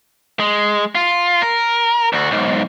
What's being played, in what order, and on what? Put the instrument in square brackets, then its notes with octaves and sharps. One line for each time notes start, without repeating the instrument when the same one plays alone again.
[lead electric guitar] G#3
F4
A#4
D2 F#4
B1 G#2